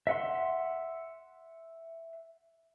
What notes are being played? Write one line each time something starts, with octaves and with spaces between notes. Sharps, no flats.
E5 F#5 C6